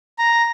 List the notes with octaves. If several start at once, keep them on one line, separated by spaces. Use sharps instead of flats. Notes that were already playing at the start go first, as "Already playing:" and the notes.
A#5